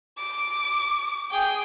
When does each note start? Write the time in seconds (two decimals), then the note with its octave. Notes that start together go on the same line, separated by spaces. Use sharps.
0.18 D6
1.32 G#4 G5